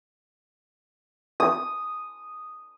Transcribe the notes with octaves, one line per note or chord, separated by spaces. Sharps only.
D#6